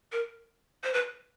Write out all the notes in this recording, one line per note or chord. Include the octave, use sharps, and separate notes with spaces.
A#4
C5
B4